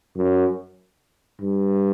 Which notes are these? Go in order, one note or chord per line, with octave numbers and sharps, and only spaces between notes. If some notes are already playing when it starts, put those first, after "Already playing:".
F#2
G2